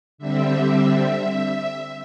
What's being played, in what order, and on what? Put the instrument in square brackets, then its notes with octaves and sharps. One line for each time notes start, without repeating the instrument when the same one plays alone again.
[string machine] D3 G3 C4 E5